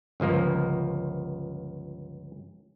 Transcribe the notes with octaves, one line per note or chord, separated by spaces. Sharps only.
G1 C#2 F3 A#3